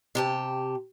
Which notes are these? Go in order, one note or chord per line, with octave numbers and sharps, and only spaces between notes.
C3 G4 A5